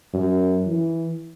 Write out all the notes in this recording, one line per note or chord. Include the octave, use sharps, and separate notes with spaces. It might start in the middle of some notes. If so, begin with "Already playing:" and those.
F#2
E3